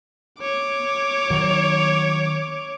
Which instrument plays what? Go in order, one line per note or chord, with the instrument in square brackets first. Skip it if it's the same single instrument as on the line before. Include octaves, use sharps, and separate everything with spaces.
[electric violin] C#5 D6
[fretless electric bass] D#3 F#3